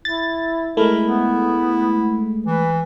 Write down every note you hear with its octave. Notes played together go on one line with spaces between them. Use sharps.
E4 A6
G#3 A3 E4 A#4
B3
E3 B4